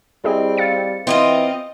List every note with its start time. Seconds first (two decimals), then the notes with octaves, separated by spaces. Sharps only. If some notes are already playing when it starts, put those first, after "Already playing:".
0.24 G3 C4 E4 G#4 D#5
0.58 F5 A6 C#7
1.07 E3 C4 D#4 F4 D#5